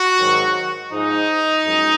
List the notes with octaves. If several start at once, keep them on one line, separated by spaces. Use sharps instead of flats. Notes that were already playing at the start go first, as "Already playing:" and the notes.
Already playing: F#4
G#2 D#3 F#3
G#2 F3 G#3 D#4
F#2 F3 G#3